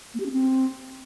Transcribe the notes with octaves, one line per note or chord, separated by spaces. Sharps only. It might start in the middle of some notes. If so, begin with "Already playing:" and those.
A#3
G4
C#4
C4